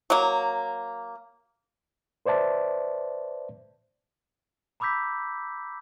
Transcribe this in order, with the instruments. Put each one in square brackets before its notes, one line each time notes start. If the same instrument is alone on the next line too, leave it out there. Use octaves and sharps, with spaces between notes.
[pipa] F#3 A#3
[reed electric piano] B4 C5 D5 E5 A5
[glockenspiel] A#5 B5 D6 E6 G6 B6